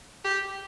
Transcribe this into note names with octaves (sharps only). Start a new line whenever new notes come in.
G4